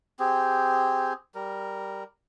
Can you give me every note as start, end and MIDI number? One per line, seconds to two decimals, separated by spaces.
0.20 1.13 60
0.20 1.13 67
0.20 1.13 68
1.35 2.04 55
1.35 2.04 70